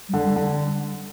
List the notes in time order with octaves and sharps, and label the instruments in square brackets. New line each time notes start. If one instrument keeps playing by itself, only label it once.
[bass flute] G3
[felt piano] D3
[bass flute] G3
[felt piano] D3
[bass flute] G3